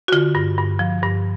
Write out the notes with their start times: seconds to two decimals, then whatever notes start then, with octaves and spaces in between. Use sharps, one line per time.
0.08 F#4
0.12 D3 F4
0.35 G2
0.58 G2
0.79 F3
1.02 G2